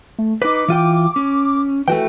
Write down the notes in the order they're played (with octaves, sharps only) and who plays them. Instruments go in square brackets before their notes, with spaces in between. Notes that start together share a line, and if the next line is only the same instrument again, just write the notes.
[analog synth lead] A3
[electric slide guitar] D#4 B4 [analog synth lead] D6
[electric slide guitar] E3 F4 G5
C#4
[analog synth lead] E3 [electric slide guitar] A3 F#4 G5